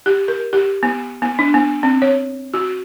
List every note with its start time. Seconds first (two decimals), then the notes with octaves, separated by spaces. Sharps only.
0.06 G4
0.28 A#4
0.53 G4
0.83 B3
1.22 B3
1.39 D4
1.54 B3
1.83 C4
2.02 C#5
2.54 F#4